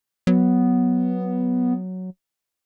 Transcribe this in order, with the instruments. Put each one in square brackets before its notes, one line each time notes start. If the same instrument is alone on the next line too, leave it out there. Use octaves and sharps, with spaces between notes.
[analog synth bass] F#3 [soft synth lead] B3